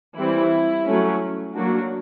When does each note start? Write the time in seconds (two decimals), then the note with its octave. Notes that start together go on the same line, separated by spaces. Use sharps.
0.15 E3 G3 C4 E4
0.85 F#3 A3 C#4
1.54 F#3 A#3 D4 F#4